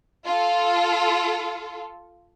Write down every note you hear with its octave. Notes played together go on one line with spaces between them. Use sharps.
F4 A4